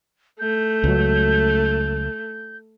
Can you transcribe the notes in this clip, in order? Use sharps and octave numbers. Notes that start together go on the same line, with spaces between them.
A3 G6
C#2 F#3